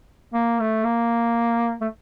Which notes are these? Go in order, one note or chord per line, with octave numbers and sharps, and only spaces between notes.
A#3
A3
A#3
A3